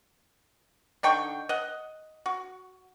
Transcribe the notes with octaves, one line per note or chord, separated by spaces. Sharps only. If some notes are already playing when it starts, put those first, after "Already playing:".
D3 D#4 G5 C#6
D#5 F#5
F#4